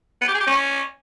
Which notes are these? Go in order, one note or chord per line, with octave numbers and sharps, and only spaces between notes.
B3
G4
G#4
G4
C#4